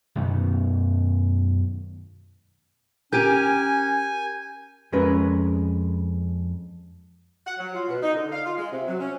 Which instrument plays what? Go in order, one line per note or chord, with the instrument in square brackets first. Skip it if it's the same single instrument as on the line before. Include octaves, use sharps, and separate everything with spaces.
[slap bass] F#2 B2 D#3 B3
[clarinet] C#4 [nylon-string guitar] G4 A#4 [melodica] G#5 [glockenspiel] G6 D#7
[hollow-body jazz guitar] F2 G#3 C#4 A#4 B4
[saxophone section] F#5
F#3
F4
B2
D#4
D3
F5
F4
G#3
C3
F#3
C#4